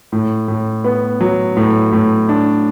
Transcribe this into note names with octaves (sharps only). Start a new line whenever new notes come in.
A2
A2
B3
F#3
A2
A2
D4